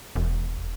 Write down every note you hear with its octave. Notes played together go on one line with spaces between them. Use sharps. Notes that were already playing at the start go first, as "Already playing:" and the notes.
E1